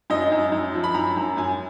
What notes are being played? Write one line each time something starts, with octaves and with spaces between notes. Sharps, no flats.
F#2 D#5
F#2
F#2
F3
B5
F#2 A#5
F#2
F#2 G#5